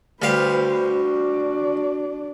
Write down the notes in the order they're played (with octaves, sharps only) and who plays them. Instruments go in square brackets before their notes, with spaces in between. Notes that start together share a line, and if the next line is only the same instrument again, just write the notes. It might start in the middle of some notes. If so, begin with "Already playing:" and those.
[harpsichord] D2 G3 F5 [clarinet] F#4 [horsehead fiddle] B4 C5
[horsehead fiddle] D4 D5